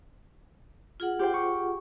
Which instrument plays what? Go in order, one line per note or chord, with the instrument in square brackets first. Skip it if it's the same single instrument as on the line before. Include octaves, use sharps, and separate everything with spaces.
[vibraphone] F4 G#4 F#5
[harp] G4 C5 G5
C#6